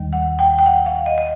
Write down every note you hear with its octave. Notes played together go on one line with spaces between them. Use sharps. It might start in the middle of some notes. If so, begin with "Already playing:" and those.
Already playing: D#2 D#3 G3
F#5
G5
G5
F#5
F5
D#5
D#5